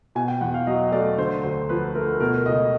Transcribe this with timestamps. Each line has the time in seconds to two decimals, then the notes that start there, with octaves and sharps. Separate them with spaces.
0.15 B2 G#5
0.28 G5
0.41 E2 F#5
0.54 F5
0.67 F#3 D#5
0.92 A3 D5
1.18 D3 C5
1.43 D2 C5
1.69 F3 B4
1.95 A3 A#4
2.20 B2 A#4
2.46 C#2 D#5